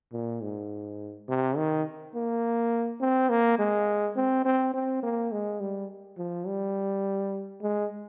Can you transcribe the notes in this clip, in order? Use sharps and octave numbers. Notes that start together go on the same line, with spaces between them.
A#2
G#2
C3
D#3
A#3
C4
A#3
G#3
C4
C4
C4
A#3
G#3
G3
F3
G3
G#3